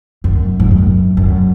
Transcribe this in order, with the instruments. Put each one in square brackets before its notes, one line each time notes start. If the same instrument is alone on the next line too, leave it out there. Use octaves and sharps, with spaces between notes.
[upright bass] F#2
G#2
F#2
F#2